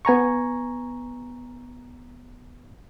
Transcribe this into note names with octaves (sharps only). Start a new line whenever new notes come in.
B3 G#5 A#5 C#6